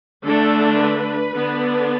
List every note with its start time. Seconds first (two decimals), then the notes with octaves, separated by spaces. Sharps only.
0.24 D3 A3 D4 A4
0.79 B4
1.33 D3 B3 D4